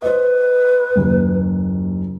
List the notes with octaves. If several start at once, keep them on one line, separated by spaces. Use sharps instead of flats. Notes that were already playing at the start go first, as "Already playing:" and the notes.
B4 C5 D#5
F#1 D#2